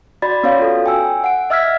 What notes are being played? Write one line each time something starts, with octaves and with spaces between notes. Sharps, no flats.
F#4 D5 B5 A6
B3 C#4 F#4 C#5 F5
F4 A4
G5 G#5 E6
F#5 D7
D#5 E5 E6 F6 G#6 B6